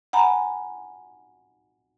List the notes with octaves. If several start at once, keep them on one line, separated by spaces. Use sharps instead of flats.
F#5 G#5 A#5 B5